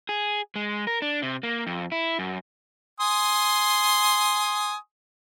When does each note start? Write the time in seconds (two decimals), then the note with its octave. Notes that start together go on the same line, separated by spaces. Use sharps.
0.09 G#4
0.55 G#3
0.87 A#4
1.02 D4
1.22 C3
1.43 A#3
1.67 F2
1.92 E4
2.19 F#2
3.00 G#5 C6 D#6